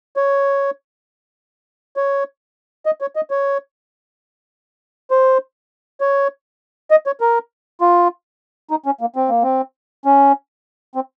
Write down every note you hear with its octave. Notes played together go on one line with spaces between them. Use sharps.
C#5
C#5
D#5
C#5
D#5
C#5
C5
C#5
D#5
C#5
A#4
F4
D#4
C#4
A#3
C4
A#3
C4
C#4
C4